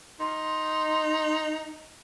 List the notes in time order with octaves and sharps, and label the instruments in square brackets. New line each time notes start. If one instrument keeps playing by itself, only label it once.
[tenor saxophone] D#4 [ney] C6